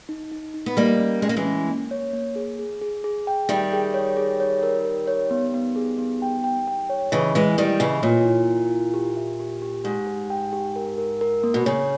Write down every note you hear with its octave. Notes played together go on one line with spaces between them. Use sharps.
D#4
D#4
D#4
B3
G3 A#3 D#5
C#4
G#3 C#4
A#3
E3 G#3
C#4
A#3
C#5
A#3
G#4
G#4
G#4
G#4
G5
D#3 G3 E5
G#4
C#5
G#4
C#5
A#4
A#4
C#5
B3
B3
G#4
B3
G5
G5
G5
C#5
C#3 E3 D#5
E3 G#3 E4
D#3 G3 D#5
C#3 E3 D#5
A#2 C#5
E4
E4
E4
G4
E5
G4
G4
G#2 G4
G4
G5
G4
A#4
A#4
A#4
A#3
B2
C#3 C#5